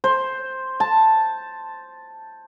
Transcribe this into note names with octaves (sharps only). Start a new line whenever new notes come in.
C5
A5